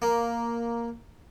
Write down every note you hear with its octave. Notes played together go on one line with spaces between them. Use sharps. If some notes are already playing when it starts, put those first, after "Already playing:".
A#3